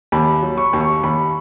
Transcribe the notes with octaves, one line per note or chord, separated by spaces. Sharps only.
D#2 B5
F#3
C#6
D#2
C#6
D#2 B5